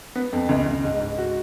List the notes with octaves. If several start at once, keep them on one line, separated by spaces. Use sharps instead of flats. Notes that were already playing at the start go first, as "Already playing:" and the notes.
B3
F2
C#2
C#2
G#2
G#2
F#4